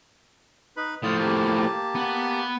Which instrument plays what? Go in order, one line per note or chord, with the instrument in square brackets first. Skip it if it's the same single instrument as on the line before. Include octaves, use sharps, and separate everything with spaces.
[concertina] D#4 B4 B5
[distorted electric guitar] A2 F3 [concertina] F4 D5 D#6
[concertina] A#3 G4 A5
[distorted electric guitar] B3